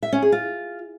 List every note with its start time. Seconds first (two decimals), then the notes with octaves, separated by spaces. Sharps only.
0.03 E5
0.12 C#4
0.22 G#4
0.32 F4